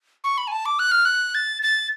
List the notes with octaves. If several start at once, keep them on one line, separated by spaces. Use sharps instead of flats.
C#6
B5
G#5
A5
D6
F#6
F6
F#6
A6
A6